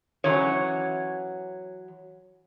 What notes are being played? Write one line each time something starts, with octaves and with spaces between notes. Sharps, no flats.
E3 F#3 C#4 C#5